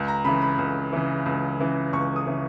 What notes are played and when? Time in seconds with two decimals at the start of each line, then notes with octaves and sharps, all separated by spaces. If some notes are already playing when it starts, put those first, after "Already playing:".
Already playing: C#2
0.08 A#5
0.25 C#3 B5
0.28 E3
0.42 B5
0.59 C#2
0.93 C#3 E3
1.26 C#2
1.59 C#3 E3
1.93 C#2 C#6
2.16 D#6
2.27 C#3 E3